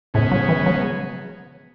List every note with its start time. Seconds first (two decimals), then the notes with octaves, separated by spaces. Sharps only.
0.14 A2 C#3 G#3 B3
0.31 F#3
0.49 E3
0.66 F#3